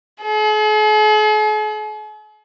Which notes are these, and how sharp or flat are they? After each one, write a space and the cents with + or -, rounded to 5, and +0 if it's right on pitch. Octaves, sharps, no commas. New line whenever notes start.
G#4 +45